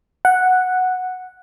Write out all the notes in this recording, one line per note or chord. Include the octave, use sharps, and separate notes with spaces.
F#5